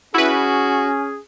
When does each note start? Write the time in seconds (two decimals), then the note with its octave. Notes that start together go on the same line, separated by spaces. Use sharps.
0.14 C#4 E4 F#4 G#4 B4